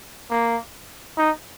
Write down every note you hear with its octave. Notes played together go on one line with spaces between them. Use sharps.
A#3
D#4